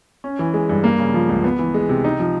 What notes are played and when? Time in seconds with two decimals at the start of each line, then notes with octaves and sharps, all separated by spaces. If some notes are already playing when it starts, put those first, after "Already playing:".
0.24 C#4
0.39 E3
0.54 G#3
0.69 G2
0.84 A#3
0.99 C#3
1.14 F3
1.29 C#2
1.44 B3
1.59 E3
1.74 G#3
1.89 C3
2.04 D#4
2.20 F3